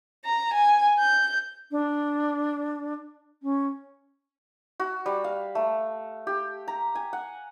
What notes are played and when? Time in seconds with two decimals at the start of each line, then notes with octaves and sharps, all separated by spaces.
0.25 A#5
0.54 G#5
0.99 G6
1.71 D4
3.43 C#4
4.80 F#4
5.06 G3
5.24 F5
5.55 A3
6.27 G4
6.68 A#5
6.95 G#5
7.13 F#5